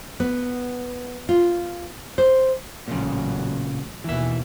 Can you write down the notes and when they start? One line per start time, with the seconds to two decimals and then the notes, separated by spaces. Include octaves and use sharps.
0.20 B3
1.29 F4
2.18 C5
2.88 A1 A#2 C#3 F#3
4.04 D#2 B2 E3 E5